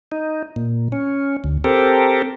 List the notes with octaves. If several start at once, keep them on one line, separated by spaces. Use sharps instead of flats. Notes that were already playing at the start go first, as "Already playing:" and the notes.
D#4
A#2
C#4
D2
C4 G4 A4 A#4